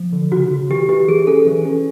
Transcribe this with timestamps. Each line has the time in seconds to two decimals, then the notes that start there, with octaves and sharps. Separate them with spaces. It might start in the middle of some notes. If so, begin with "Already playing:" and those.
Already playing: F3
0.13 D3
0.32 C#3 F#4
0.51 C#3
0.70 E3 G4
0.89 E3 G4
1.08 E3 G#4
1.27 C#4 A4
1.46 E3
1.65 C#4